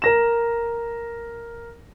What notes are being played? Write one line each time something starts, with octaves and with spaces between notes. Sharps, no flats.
A#4 A#6 E7